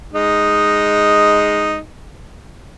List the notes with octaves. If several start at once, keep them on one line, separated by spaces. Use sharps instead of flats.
G#3 D#4